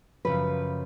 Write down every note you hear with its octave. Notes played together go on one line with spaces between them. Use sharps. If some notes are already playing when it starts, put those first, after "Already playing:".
F#2 C#3 F3 B4